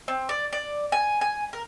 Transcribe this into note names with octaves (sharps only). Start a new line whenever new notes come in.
C4
D5
D5
G#5
G#5
A#4